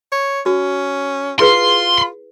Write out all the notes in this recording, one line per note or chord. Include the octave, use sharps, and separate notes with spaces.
C#5
C#4 F#4
E4 F4 G#4 B4 C6